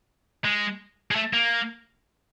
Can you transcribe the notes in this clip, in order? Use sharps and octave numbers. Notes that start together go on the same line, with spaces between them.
G#3
G#3
A3
A#3